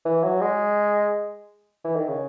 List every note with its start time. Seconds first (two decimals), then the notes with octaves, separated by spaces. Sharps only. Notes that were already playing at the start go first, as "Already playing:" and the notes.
0.05 E3
0.23 F#3
0.41 G#3
1.84 E3
1.96 D#3
2.07 C#3